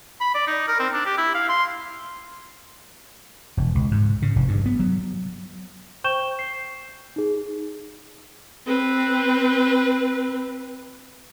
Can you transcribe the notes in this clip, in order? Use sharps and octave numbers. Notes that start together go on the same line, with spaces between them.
B5
D5
D#4
A#4
C4
D4
G4
E4
F5
C6
E1
C#2
G#2
C#3
F1
G2
B3
F#3
C5 G5 C#6 G6 E7 G7
C7
D#4 G#4
C4 B4